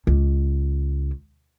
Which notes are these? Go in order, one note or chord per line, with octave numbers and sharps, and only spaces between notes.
C#2